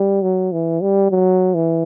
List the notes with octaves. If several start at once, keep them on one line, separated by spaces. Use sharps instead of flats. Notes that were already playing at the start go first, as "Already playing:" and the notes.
Already playing: G3
F#3
E3
G3
F#3
E3